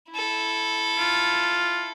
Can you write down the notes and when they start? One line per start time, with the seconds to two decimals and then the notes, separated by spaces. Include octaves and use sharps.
0.11 E4 A4
0.98 F4